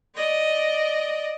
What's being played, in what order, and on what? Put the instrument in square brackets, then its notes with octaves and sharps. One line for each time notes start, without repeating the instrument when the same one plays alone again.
[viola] D5 D#5